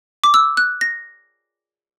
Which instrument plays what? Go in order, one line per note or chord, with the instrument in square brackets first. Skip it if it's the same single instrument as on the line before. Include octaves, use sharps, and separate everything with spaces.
[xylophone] D6
E6
F#6
A#6